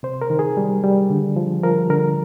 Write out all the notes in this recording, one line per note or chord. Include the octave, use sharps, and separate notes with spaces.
C3 C5
A#4
D#3
G#4
G3
G3
D3
F3
F3 A#4
D3 A#4